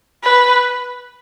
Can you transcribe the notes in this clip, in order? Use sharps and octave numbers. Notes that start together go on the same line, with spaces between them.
B4